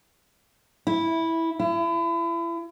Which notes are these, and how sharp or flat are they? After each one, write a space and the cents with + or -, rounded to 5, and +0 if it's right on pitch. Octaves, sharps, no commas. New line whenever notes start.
E4 -10
E4 +35